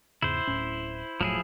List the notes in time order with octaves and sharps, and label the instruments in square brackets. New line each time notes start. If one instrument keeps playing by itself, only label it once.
[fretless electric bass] E2 G#2 C#3 [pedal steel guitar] E4 C5
[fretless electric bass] D1 A2 C#4
[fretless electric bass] E1 A2 F#3 [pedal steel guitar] F3 E4 G#4